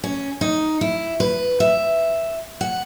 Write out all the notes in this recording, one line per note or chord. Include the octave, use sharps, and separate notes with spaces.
C#4
D#4
E4
B4
E5
F#5